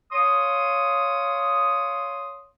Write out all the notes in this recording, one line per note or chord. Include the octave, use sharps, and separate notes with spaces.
C#5 F5 C6 D#6